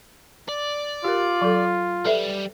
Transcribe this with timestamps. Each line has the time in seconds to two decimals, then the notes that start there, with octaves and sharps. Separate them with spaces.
0.49 D5
1.04 F4 G4 A#4
1.42 F#3 A4
2.05 G3 A4 B4 E5